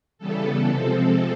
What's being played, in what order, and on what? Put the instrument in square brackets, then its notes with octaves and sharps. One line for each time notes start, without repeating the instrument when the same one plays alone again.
[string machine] C#3 E3 G3 B3 A4
C3 F3 G#3 C4